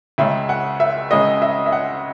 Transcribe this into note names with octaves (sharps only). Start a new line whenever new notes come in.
C#2 C#3 G#3 E5
F#5
E5
C#2 C#3 G#3 D#5
E5
E5
F#5